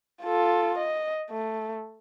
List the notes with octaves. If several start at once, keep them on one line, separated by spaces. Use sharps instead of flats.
F4 A4
D#5
A3